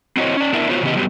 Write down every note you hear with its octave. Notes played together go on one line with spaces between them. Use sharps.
C4 E4 F#4 C5 C#5 D#5
C#4 D5
B3 D4 E4 A#4 E5
B3 F4 F#4 C5 C#5
C#3 E3 B3 G4 D#5
F#3 G3 B3 G4